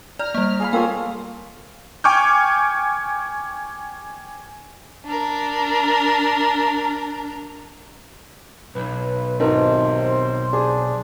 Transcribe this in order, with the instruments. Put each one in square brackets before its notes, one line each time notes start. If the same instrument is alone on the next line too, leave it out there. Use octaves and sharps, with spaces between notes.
[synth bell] D5 [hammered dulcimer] A#5 [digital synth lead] F6
[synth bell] G3 A#3
[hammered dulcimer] G#4 F5 B5
[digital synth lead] A#3 [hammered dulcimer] F4 A4 C#5 [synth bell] G5
[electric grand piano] G5 G#5 C#6 D6 F6 G6
[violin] D4 A#4
[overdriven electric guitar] B1 [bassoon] B4
[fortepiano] G#1 D#3 [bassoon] C3 [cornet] C5
[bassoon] D4 [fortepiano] G#4